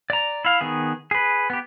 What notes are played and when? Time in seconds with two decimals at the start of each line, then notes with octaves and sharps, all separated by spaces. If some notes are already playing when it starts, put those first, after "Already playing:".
0.10 D5 A#5
0.45 E4 F5
0.61 D#3 B3 G#4
1.11 G#4 B4
1.50 B3 G4